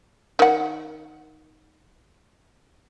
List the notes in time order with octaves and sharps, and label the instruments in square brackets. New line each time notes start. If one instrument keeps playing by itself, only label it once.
[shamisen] D#3 F#5